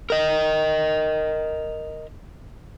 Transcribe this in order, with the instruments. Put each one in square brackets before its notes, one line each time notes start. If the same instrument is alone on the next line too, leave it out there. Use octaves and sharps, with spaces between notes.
[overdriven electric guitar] A#4 D#5